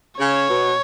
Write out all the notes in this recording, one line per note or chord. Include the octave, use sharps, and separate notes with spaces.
C#3 C#5
B2